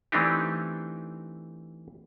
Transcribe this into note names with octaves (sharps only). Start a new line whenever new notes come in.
E3 A3 C4 D4 D#4 G4